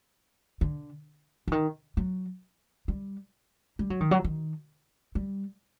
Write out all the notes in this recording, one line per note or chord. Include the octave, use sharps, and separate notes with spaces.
D3
D3
D#3
F#3
G3
G3
F#3
D#3
F#3
D#3
G3